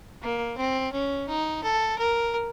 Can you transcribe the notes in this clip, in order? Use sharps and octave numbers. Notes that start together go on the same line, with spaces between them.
A#3
C4
C#4
D#4
A4
A#4